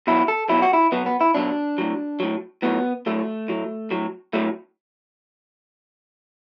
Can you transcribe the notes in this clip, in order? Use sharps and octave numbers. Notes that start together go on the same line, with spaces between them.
B2 F#3 E4
A4
B2 F#3 E4
F#4
E4
B2 F#3 B3
B3
E4
B2 F#3 D4
A2 F#3
A2 F#3
A2 F#3 B3
A2 F#3 A3
A2 F#3
A2 F#3
A2 F#3 A3